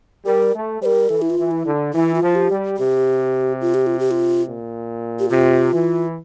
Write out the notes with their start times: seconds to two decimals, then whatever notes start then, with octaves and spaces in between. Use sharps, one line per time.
0.25 G3 A#4
0.54 A3
0.81 G3 C5
0.85 A#4
1.09 E3 A4
1.22 E4
1.30 F4
1.38 E3
1.51 E4
1.65 D3
1.93 E3 E4
2.14 F4
2.22 F3
2.35 G4
2.49 G3
2.77 C3 G4
3.61 F4
3.74 G4
3.86 F4
3.99 G4
4.11 F4
4.46 A#2
5.19 G4
5.29 C3 F4
5.72 E3